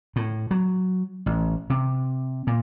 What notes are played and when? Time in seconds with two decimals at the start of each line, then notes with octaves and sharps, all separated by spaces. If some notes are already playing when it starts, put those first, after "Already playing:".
0.16 A2
0.51 F#3
1.26 A1
1.70 C3
2.47 A#2